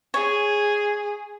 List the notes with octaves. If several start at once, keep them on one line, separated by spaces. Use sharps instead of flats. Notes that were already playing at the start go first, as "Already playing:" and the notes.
G#4 C#5